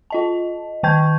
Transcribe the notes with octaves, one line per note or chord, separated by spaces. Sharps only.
F4 D#5 A5
D#3 G5 A5 C#6 G6 G#6